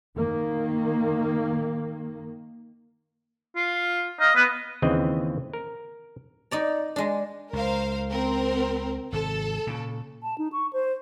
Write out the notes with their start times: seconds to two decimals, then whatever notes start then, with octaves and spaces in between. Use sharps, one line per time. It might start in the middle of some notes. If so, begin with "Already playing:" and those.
0.16 D#3 A#3
3.56 F4
4.20 D#5 F5
4.35 B3 B4
4.82 D#2 C#3 E3 C4 D#5
5.54 A#4
6.51 D#4 D5 A#5
6.96 G#3 D4
7.53 C#2 A#4 C5 F5
8.10 C4 A#4
9.12 G#1 C3 A4
9.67 A#2 C#3
10.23 A5
10.38 D#4
10.52 C#6
10.73 C5